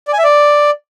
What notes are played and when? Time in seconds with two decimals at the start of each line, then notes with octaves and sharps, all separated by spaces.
0.08 D5
0.13 G#5
0.18 E5
0.24 D5